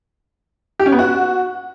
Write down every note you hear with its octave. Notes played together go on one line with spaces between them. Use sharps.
G4
C#4
B3
F#4